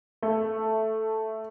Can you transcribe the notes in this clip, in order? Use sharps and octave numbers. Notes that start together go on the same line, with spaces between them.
A3